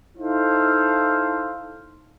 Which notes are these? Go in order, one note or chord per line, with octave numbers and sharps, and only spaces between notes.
D#4 E4 A4 C5 F5